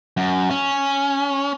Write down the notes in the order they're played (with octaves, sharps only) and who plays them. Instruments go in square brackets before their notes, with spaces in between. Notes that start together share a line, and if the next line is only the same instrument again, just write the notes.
[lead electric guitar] F#2
C#4